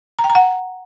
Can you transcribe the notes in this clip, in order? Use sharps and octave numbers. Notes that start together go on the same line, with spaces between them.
A#5
G5
A#5
F#5